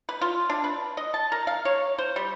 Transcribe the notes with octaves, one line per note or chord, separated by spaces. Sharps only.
B4
F4
D4
B4
D#5
A5
A#4
F5
C#5
C5
G3